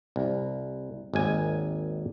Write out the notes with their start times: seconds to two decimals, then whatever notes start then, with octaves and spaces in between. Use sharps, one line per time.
0.16 C2
1.14 G#1 D#2 G#5